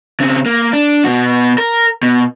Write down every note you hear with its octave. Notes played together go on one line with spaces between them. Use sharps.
C#3 C4
A#3
D4
B2 F#4
A#4
B2